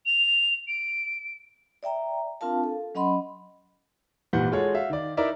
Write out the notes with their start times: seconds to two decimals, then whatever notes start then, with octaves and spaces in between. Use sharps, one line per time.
0.06 F7
0.68 D7
1.83 D5 E5 G5 A#5
2.41 C4 D4 F4 A#4 F5 A5
2.64 A4
2.95 F#3 C#4 D#5 F#5 B5 C6
4.33 G#1 A#2 E3 G3 F#5 G6
4.52 G#3 F4 F#4 G#4 A4 C#5
4.74 F#4 E5 F5
4.90 D#3 D5
5.17 D#4 E4 A#4 D5 E5